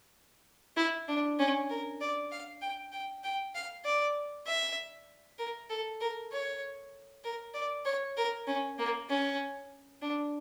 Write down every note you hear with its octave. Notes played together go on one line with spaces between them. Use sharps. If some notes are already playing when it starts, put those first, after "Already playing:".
E4
D4
C#4
A#4
D5
F5
G5
G5
G5
F5
D5
E5
A#4
A4
A#4
C#5
A#4
D5
C#5
A#4
C#4
A#3
C#4
D4